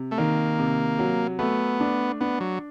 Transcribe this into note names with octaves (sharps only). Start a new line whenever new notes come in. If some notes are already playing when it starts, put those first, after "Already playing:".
Already playing: C3
A3
D#3 A#3
C3
F#3
A3 B3
D4
B3 D4
F#3